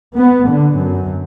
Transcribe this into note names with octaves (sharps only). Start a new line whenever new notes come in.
B3
D3
F#2